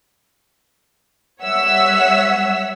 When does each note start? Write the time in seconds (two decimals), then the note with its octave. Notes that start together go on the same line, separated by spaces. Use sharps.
1.41 G3 C#5 E5 F#5 E6 B6